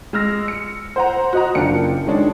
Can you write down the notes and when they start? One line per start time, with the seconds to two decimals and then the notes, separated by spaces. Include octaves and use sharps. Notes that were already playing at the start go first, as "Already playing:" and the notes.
0.13 G#3 E6 F6 A#6
0.48 C#7
0.96 C5 F#5 A#5
1.33 F#4 D#5 A#5
1.55 F#1 A#3 D4 F4 G5 C#7
2.06 D#3 G#3 C#4 D4